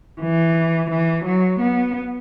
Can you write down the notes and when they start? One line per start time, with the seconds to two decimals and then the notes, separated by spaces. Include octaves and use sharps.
0.21 E3
0.90 E3
1.25 F#3
1.60 B3